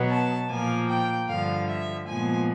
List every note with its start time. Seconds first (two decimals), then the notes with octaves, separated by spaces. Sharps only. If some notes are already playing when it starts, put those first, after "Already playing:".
Already playing: B2 F#3 B3
0.10 A5
0.50 A#2 F3 A#3 G#5
0.89 G5
1.29 G2 D3 F3 F5
1.68 E5
2.08 A#2 F3 G#3 B3 G#5